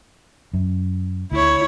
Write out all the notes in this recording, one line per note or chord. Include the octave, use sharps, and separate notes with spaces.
F#2
D2 E4 C#5